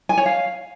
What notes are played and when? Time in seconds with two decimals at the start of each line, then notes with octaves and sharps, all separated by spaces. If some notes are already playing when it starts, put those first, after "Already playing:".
0.09 G#5
0.17 C#5
0.26 F5